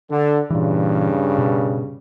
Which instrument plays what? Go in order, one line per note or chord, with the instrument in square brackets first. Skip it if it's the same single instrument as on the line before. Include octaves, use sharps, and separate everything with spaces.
[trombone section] D3
[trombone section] G2 C#3 [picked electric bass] A#2 E3
[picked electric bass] B2